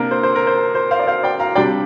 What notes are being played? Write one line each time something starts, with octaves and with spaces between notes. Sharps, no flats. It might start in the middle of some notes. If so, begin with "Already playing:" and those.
Already playing: C3 A#3 D4 A#4
C5
C5
A#4
C5
C5
C5 F5
D5
C5 F5
D5 G5
F5 A#5
C3 G3 D4 D5 G5